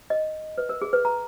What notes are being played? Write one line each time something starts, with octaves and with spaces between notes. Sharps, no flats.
D#5
B4
A#4
G#4
B4
A#5